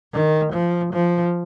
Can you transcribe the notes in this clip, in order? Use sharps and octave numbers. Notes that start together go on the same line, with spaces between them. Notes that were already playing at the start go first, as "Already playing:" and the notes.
D#3
F3
F3